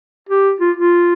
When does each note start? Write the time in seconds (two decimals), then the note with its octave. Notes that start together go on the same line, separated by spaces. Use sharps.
0.29 G4
0.60 F4
0.77 F4